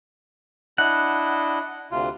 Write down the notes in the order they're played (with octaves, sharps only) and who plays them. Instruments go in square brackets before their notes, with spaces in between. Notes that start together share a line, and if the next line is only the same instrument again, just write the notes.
[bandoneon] D4 E4 D#5 [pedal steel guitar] F#5
[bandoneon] D2 C3 F4